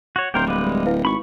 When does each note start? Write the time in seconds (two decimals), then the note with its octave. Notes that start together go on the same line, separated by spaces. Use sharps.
0.16 F#4 C#5
0.34 D1 G4 A#4 C5
0.47 G3 G#3 B4 F5 D6
0.86 E4 B4 F5
1.05 G#1 B5 C#6